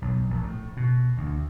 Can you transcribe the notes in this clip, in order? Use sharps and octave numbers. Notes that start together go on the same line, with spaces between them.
B1
A#1
A2
B2
D2